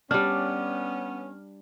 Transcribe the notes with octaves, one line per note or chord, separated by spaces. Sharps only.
G3 B3 C#4 D4 F6